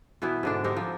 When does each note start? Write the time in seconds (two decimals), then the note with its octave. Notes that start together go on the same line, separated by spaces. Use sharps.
0.22 B2 E3 B3 E4
0.43 G#2 D3 D4
0.64 C4 D#4 G4 A#4
0.77 F3